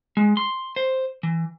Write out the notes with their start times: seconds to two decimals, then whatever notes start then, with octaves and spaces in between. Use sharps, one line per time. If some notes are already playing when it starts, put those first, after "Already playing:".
0.17 G#3
0.37 C6
0.76 C5
1.23 E3